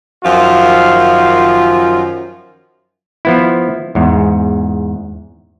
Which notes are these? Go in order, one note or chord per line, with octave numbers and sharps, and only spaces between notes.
F#2 D#3 F3 F4
F3 B3 E4
E2 G#2